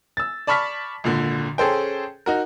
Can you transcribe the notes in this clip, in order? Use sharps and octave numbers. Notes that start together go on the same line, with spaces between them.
E6 A6
D5 A5 B5 C#6 F6 B6
G#1 A#2 D3
C#4 G#4 A4 C5 G5
D#4 F#4 A#4